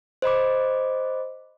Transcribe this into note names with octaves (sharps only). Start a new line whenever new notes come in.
C5 D#5 B5 D6